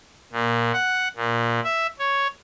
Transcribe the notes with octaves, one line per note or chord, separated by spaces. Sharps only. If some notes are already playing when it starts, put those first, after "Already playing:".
A#2
F#5
A#2
E5
C#5